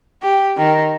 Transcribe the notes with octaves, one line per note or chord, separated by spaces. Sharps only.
G4
D#3